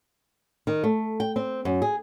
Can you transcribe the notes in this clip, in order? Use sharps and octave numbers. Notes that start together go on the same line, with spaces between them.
D#3
A3
G5
C4
F#2
G#4